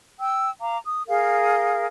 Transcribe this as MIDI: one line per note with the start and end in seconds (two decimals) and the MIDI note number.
0.19 0.50 79
0.19 0.50 88
0.61 0.78 77
0.61 0.78 82
0.61 0.78 86
0.85 1.03 87
1.08 1.86 68
1.08 1.86 70
1.08 1.86 77